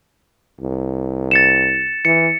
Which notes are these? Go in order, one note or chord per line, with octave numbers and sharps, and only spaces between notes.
C2
A6 C#7 E7
E3 C#7